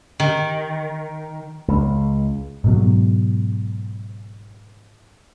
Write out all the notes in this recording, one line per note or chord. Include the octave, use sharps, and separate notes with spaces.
D#3
C#2
G#2 B2 F#3